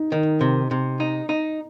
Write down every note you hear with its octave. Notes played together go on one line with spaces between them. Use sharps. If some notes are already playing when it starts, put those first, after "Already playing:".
Already playing: D#4
D#3
C3
C3
D#4
D#4